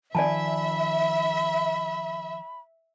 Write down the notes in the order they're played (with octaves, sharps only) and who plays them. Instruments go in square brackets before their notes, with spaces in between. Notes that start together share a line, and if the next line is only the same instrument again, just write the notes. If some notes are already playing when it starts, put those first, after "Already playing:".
[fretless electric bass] D#3 F3 [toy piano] D5 G#5 A5 [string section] E5 [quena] B5